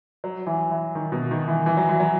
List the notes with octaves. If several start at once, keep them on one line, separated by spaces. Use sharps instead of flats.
F#3
E3
E3
D#3
B2
D#3
E3
E3
F#3
E3
F#3